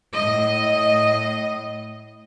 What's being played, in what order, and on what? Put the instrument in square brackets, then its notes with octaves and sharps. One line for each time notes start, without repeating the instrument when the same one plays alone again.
[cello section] A2 D#5